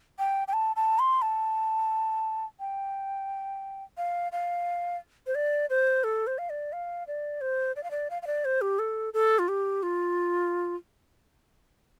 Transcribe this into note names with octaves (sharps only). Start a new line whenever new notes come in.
G5
G5
A5
A5
C6
A5
G5
F5
F5
C5
D5
C5
A4
C5
F5
D5
F5
D5
C5
D5
F5
D5
F5
F5
D5
C5
G4
A4
A4
F4
G4
F4